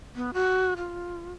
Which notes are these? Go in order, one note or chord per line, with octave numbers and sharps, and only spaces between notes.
B3
F#4
F4